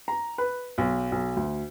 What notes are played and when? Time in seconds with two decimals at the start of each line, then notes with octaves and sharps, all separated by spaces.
0.08 A#5
0.38 B4
0.78 B1
1.12 B1
1.37 D2